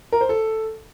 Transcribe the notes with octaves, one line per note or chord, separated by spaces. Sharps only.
A#4
C5
A4